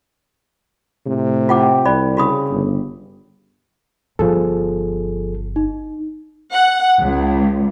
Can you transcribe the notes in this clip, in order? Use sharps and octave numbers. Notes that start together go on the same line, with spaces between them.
A2 C3
F4 G4 F#5 D6
C2 C5 D5 B5
C#3 F#4 B5 D#6
G1
G1 F3 G#4 A4
D#4
F#5
C#2